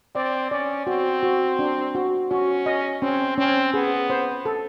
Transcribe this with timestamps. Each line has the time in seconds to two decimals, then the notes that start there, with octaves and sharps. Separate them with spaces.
0.15 C4 D5
0.51 C#4 D5
0.86 C4 F#4
1.23 F#4
1.59 D4
1.95 F#4
2.31 C#4 F#4
2.66 D#5
3.02 C4 C#4
3.38 C4 C#4
3.74 B3 G#4
4.10 C5
4.45 A4